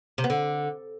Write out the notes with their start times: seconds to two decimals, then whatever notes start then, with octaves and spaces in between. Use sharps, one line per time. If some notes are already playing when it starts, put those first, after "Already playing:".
0.18 C3
0.24 B3
0.30 D3